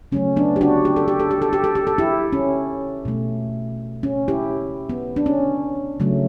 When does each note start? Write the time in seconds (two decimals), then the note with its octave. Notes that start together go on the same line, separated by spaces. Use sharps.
0.12 C#3 F#3 A3 C#4
0.36 B3 D4
0.56 G4
0.61 D4 F#4
0.85 G4
0.96 A4
1.08 G4
1.20 A4
1.31 G4
1.42 A4
1.53 G4
1.64 A4
1.75 G4
1.87 A4
1.98 E4 G4
2.33 C#4
3.05 B2 A3
4.03 C#4
4.28 E4 G4
4.89 B3
5.16 D4
5.26 C#4
6.00 C#3 F#3 A3